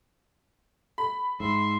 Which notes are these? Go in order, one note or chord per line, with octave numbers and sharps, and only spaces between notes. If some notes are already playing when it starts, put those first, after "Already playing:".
B5
G#2 E5 C6